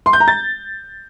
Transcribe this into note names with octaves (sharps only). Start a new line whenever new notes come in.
C6
G6
A#5
A6